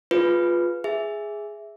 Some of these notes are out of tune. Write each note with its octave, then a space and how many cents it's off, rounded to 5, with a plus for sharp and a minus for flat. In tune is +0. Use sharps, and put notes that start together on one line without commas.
F4 +5 G#4 +0 B4 +5
G#4 +0 E5 +0